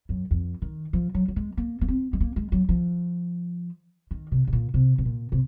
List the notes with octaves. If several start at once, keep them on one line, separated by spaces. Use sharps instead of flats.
F#2
F2
D#3
F3
F#3
F#3
G#3
A#3
A#3
C4
G#3
A#3
G#3
F#3
F3
D#3
C3
C3
A#2
C3
C3
A#2
C3